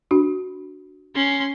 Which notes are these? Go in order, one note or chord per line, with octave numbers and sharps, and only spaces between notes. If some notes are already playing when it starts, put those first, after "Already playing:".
D4 F#4
C#4 C6